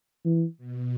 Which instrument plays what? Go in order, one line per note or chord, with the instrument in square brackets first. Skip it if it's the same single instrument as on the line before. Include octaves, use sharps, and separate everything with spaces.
[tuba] E3
[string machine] B2